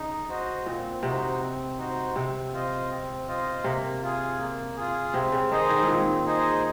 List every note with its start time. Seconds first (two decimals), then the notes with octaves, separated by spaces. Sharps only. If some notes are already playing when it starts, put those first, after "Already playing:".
Already playing: C#3 D#4
0.29 F#4 C5 D#5
0.66 A#2 C4
1.03 C3 D#4 F#4 C5
1.41 C4
1.78 D#4 F#4 C5
2.16 C3 C4
2.53 F4 C5 D#5
2.90 C4
3.27 F4 C5 D#5
3.64 C3 A#3
4.02 F4 G#4
4.38 A#3
4.77 F4 G#4
5.14 C3 C4
5.32 C#3
5.51 D#3 D#4 G#4 C5 D#5
5.70 D#3
5.83 G#2
5.88 A#2 C4
6.26 D#4 G#4 C5 D#5